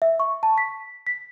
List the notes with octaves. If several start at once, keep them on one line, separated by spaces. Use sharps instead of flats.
E5
C#6
A5
B6
B6